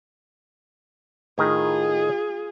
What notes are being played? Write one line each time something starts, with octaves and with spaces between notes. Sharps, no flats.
A2 D#3 F4 G#4 A#4